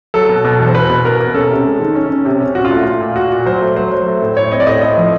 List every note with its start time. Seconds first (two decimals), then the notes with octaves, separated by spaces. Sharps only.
0.14 F#3 A4
0.29 B2
0.44 B2
0.60 E2
0.67 C5
0.75 B2 B4
0.90 B2
1.04 B2 A#4
1.20 B2
1.34 C#4 A4
1.50 C3
1.65 G#3
1.80 D#3
1.95 C#4
2.10 C#4
2.25 C3
2.41 C#4
2.55 A#2 F#4
2.65 F4
2.71 A3
2.83 A3 F4
3.00 A#2
3.15 A#2 F#4
3.30 A#2
3.46 F#3 C5
3.61 A3
3.76 F#3 C5
3.91 F#3
4.06 A3
4.22 A2
4.37 A2 C#5
4.51 C4 D#5
4.60 D5
4.66 A2 D#5
4.82 A3 D#5
4.97 F3